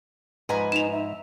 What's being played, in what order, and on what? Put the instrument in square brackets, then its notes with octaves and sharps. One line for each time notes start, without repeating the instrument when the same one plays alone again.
[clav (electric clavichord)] G#2 F3 [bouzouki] B4 G#5 A#5
[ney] D#4 [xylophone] E7 F7
[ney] E5